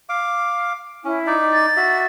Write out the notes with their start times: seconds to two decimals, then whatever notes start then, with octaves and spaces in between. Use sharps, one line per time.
0.09 F5 D6
1.04 C#4 E4
1.27 D#4 D5
1.52 A6
1.77 F#4 E5